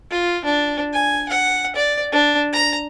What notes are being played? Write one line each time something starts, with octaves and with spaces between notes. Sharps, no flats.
F4
D4
G#5
F#5
D5
D4
A#5